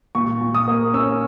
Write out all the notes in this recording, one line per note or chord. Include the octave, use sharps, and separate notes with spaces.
A#2 C#6
A#2
D#6
A#3
C#4 E6